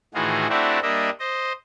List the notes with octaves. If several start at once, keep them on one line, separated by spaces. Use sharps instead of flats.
A2 D#3 E3 F4 F#4 G#4
A3 C4 D4 E4 F#4 G4
G3 A#3 D4 D#5 E5
C5 D#5